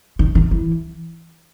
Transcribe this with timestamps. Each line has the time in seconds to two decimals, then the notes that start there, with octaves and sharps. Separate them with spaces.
0.19 D#3
0.35 D#3
0.51 E3